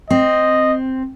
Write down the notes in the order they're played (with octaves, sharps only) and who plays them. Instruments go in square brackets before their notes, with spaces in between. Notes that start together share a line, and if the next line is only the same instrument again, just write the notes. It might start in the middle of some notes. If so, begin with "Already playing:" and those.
[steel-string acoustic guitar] C4 [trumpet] D#5